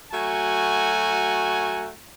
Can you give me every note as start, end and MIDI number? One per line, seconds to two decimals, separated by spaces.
0.11 1.89 54
0.11 1.89 57
0.11 1.89 66
0.11 1.89 80